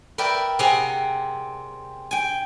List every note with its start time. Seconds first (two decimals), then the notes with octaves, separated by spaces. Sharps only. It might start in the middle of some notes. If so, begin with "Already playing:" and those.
0.18 A#4 B4 D5 E5 G5
0.59 C3 C4 G#4 F#5 G#5 A#5
2.11 G5 G#5